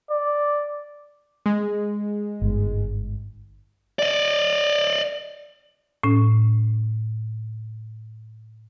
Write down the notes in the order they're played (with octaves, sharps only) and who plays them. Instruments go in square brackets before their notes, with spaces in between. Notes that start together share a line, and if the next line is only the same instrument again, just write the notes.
[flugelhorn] D5
[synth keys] G#3
[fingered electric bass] G1 G#2
[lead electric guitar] D5 D#5
[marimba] A2 C#4